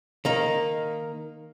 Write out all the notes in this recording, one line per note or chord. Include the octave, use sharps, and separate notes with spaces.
D#3 A#3 D#4